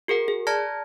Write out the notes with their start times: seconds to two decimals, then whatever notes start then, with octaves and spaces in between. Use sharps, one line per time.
0.08 F#4 G#4 A#4 F#5
0.28 G#4
0.47 D5 A5 A#5 F6 G#6 A#6